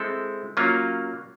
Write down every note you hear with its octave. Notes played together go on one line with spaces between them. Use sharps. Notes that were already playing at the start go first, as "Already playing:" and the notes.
Already playing: G#3 C4 E4 A4
F#3 A#3 C#4 F4